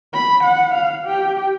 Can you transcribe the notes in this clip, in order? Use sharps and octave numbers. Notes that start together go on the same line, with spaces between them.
B5
F#5
F5
G4